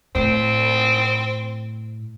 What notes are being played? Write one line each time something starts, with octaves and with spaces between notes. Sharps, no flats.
A2 C4